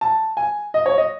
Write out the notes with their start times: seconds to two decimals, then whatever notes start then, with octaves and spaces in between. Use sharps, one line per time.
0.01 A5
0.37 G#5
0.74 D#5
0.86 C#5
0.98 D#5